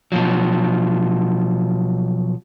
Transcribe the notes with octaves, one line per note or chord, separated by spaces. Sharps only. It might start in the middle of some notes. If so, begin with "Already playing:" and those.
B2 F3 F#3